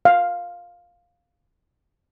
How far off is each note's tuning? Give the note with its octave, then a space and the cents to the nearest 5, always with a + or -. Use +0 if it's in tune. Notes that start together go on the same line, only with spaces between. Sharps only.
F5 +10